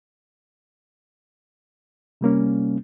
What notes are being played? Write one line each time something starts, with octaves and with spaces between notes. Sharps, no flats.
C3 G3 A#3 C#4